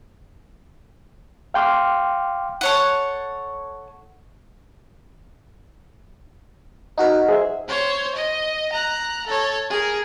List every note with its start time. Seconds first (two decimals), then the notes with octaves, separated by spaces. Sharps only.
1.54 F5 G5 C6 D6 F6
2.61 A4 C#5 F#5
6.98 D#4 F#4 A#4
7.29 G#4 C5 E5
7.68 C5 C#5
8.15 D#5
8.73 A#5 F#6
9.27 A4 C#5
9.70 G#4 A#4